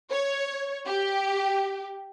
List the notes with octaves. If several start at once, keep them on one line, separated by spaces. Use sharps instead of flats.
C#5
G4